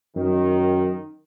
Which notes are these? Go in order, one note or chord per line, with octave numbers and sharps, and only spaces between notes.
F#2 D#3